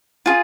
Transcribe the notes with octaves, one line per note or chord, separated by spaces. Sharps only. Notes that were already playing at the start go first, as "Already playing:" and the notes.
F4 G#4